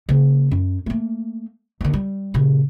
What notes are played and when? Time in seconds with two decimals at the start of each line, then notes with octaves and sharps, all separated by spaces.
0.09 C#3 A#3
0.51 F#2
0.86 A3 A#3
1.81 D#2 D3
1.94 G3
2.34 A#2 C#3